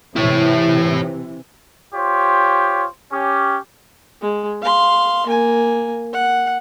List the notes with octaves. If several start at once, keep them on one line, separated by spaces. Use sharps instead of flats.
C3 E3 E4 C#5
F4 G4 C5 C#5
C#4 G4
G#3
F5 C6
A#3 G#5
F#5